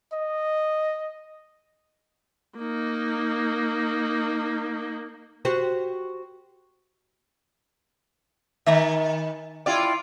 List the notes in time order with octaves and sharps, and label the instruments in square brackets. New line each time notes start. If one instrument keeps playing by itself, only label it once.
[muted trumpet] D#5
[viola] A#3 D#4
[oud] F#4 G4 C5
[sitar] D#3 [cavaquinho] E5 G#5 A#5
[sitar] E4 F4 D5 [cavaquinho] G4